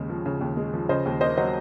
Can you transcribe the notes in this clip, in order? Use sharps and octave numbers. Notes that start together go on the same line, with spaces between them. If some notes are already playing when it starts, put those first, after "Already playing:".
Already playing: D#2 C#3 G#3
F3
C#3
D#2
G#3
F3
C#3 C5 D#5
D#2
A#3 C5 D#5
F#3 C5 D#5